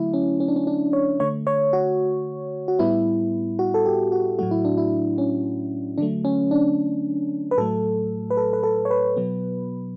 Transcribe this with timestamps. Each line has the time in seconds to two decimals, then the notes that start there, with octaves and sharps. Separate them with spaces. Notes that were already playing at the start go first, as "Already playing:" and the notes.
Already playing: D3 F#3 A3 E4
0.14 C#4
0.40 C#4
0.48 D4
0.56 C#4
0.67 D4
0.93 C#5
1.20 D3 A3 C#5
1.47 C#5
1.73 F#4
2.68 F#4
2.79 A2 G3 B3 E4
3.59 F#4
3.74 A4
3.86 G4
4.12 F#4
4.39 A2 F#3 A3 F#4
4.51 E4
4.65 D4
4.78 E4
5.18 C#4
5.98 D3 F#3 A3 D4
6.25 C#4
6.51 D4
7.51 B4
7.57 A2 F#3 A3 A4
8.30 B4
8.37 A4
8.53 B4
8.63 A4
8.85 C#5
8.91 B4
9.17 B2 F#3 B3